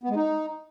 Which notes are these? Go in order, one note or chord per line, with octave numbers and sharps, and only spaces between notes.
B3
G#3
D#4